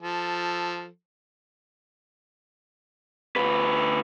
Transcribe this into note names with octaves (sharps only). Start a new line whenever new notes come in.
F3 A4
D2 B4